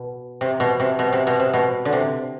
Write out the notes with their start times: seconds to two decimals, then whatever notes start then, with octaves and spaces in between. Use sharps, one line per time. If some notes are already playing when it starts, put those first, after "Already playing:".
Already playing: B2
0.41 C3
0.60 B2
0.80 C3
0.99 B2
1.13 C3
1.27 B2
1.40 C3
1.53 B2
1.85 D3
1.93 C3